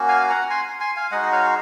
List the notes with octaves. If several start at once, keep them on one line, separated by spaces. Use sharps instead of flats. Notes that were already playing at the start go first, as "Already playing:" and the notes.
Already playing: A#3 C#4 F#4
F5 G#5
F#5 A#5
G#5 C6
G#5 C6
F5 G#5
G#3 D#4 F#4 D#5 F#5
D#5
C#5 F5